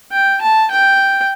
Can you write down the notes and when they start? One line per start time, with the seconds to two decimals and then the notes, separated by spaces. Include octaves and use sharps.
0.12 G5
0.41 A5
0.71 G5